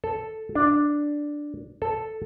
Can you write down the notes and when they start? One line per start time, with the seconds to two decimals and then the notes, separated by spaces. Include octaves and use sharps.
0.04 A4
0.55 D4
1.82 A4